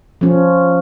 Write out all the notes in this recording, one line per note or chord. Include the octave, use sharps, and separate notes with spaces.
F3 C#4